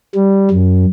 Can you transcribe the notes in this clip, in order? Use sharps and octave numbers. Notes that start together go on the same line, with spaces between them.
G3
F#2